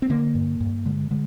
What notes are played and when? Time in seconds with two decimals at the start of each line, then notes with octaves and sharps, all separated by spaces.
0.02 C4
0.10 D3 A#3
0.35 G2
0.60 G2
0.86 D3 G#3
1.11 D3 G#3